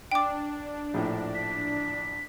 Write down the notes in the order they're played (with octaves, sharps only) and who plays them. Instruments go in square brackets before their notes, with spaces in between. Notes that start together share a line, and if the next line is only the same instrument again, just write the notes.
[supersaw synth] D4 [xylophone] G5 D6
[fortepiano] A#1 A2
[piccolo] B6